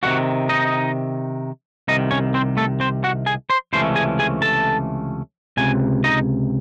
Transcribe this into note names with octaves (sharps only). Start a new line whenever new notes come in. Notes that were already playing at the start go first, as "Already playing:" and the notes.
C3 D#3 G#3 C#4 F#4 F#5
D#4 D#5
C2 C3 D#3 D#4 D#5
C#4 C#5
C4 C5
A3 A4
C4 C5
F#4 F#5
G#4 G#5
C5 C6
C#2 C3 E3 A3 C#4 C5 C6
G#4 G#5
G#4 G#5
A4 A5
C#2 C3 G#5
D#4 D#5